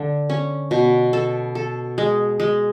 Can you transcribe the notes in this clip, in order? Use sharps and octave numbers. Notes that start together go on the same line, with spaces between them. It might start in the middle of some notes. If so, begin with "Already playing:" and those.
Already playing: D3
C#4
B2
A4
A4
G#3
G#3